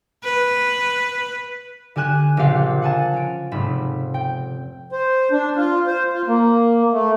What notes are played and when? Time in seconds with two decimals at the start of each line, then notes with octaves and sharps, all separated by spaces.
0.24 B4
1.96 D3 G4 G#5 F#6 E7
2.37 A#1 C#3 G4 F5 F#5
2.82 F#5 G#5 A5
3.13 C#4 D7
3.52 F1 G#2 B5 E7
4.14 G5
4.92 C5
5.31 D4
5.56 F4
5.87 C5
6.13 F4
6.27 A#3
6.93 A3